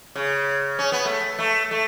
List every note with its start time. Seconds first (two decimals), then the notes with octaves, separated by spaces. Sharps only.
0.15 C#3
0.79 C#4
0.92 B3
1.05 A3
1.39 A3
1.71 A3